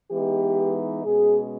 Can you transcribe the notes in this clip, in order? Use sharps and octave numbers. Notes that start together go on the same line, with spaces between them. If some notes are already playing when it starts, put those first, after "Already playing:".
E3 G#3 B3 D#4 G4
B2 G#3 C#4 G#4